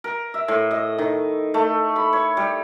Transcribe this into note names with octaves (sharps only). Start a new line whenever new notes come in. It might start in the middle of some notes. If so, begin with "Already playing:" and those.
A#4
E5
A2
D#5
D#3
A3
B5
C#5
G3